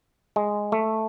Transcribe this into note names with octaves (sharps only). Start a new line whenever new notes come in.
G#3
A3